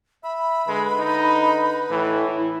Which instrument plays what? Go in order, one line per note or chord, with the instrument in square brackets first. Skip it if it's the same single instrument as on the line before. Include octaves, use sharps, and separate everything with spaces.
[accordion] E5 E6 [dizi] B5
[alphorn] D3 [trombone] G#3 [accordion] B4
[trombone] D#4
[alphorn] A2 [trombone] E3
[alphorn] E4